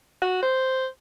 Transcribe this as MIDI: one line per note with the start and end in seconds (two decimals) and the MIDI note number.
0.22 0.42 66
0.42 0.86 72